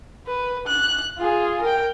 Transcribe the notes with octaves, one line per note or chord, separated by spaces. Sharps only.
B4
F#6
F4 G#4
A#4 G5